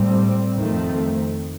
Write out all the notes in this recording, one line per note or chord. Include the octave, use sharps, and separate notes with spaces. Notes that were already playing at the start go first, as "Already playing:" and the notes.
Already playing: A2 G3 C4
F2 D#3 A3 C4